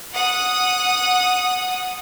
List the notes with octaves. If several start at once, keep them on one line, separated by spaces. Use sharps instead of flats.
F#5 D#6